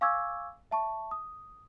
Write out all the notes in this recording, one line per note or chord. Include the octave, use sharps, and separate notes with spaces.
F5 G#5 C#6 D6 E6 G#6
E5 A5 C#6
D#6